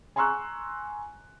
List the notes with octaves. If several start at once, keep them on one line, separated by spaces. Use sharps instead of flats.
G#5 A#5 C6 C#6 E6 F#6